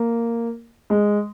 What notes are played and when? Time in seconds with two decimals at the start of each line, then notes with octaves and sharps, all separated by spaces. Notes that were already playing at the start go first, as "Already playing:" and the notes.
Already playing: A#3
0.90 G#3